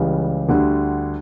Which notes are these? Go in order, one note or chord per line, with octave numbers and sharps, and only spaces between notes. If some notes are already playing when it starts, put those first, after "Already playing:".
Already playing: C#2 C#3 E3 G3
D2 D3 G3